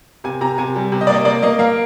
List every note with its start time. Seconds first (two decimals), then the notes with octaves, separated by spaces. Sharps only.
0.24 C3 G#5
0.41 C3 A#5
0.58 C3 G#5
0.76 G3
0.92 C3
1.01 D#5
1.07 A#3 D5
1.14 D#5
1.25 A#3 D5
1.42 A#3 D#5
1.59 A#3 F5